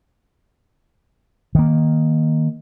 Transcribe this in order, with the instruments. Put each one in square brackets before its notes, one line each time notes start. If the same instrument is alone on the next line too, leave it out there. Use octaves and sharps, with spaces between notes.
[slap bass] D#3 A#3